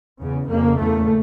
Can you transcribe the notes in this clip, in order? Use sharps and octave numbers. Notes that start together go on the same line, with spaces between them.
E2 C#3
F2 C#3 A#3
E2 C#3 A3